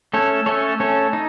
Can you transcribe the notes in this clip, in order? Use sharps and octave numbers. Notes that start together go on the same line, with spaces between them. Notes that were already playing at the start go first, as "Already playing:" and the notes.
A3 C#4 A4 C#5
A3 C#4 A4 C#5
A3 C#4 A4 C#5
D#4